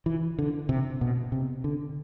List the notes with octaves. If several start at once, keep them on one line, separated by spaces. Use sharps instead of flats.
E3
D3
C3
B2
C3
D3